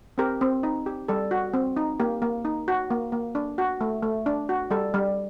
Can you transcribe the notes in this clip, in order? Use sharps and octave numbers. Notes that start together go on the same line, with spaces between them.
C4 G4 A#4
C4
D#4
G4
G3 A4
F#4
C4
D#4
A#3 G4
A#3
D#4
F#4
A#3
A#3
D4
F#4
A3
A3
D4
F#4
G3 A4
G3